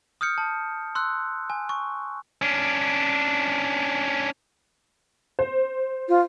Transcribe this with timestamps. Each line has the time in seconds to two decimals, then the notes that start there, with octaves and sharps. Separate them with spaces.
0.21 D#6 F6 G6 C#7
0.38 A5
0.95 C6 E6 F#6
1.50 G#5
1.69 C#6
2.42 C#4 D4
5.39 C5
6.09 F4